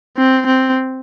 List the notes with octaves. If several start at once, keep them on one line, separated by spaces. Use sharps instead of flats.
C4
C4